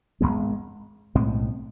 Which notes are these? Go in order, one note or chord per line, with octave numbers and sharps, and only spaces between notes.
G#1 G#2 G#3 B3
B1 A2 G#3 C4